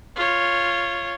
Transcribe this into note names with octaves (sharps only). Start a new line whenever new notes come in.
F4 C#5